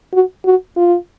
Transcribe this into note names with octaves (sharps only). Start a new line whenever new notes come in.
F#4
F#4
F4